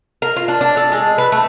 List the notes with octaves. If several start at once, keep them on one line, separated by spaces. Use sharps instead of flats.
A#4
F4
D4
D4
A4
G#3
B4
A3